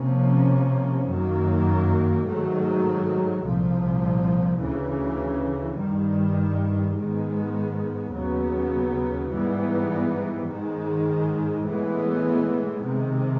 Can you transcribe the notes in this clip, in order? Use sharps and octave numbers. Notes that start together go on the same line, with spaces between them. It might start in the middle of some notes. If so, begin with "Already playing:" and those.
Already playing: C3 F3 A#3 C#4
F#2 D#3 F#3 A#3
G#2 D#3 F#3 A3
C2 A#2 F3
D2 C#3 E3
G2 D#3 G3
G#2 D#3 G#3 B3
D#2 C#3 F#3 B3
G#2 E3 G3 B3
G#2 D#3 G#3
A2 E3 G#3 B3
C3 D#3 G#3